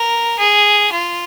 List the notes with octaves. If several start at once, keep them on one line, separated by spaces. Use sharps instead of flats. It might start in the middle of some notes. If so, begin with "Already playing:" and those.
Already playing: A#4
G#4
F4